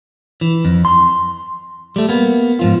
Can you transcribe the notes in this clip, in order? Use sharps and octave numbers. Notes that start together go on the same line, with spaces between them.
E3
F2
C6
G3 A3
A#3 B3
G#2 F3 F4